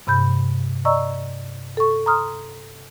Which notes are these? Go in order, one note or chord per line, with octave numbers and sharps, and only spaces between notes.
G2 C3 B5 G6
D5 D#5 A#5 C#6 E6
A4 C#6
A#5 C6 D#6 F6